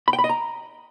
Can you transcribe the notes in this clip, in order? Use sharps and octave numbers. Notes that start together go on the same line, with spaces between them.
B5
G5
B5
D#5
A#5